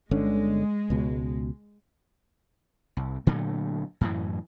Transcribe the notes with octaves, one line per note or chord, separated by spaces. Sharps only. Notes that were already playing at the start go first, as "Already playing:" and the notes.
G1 D3 G#3 C#4
C#2 B2
C2
A#2 D3 F#3 A3
F#2 A2 E3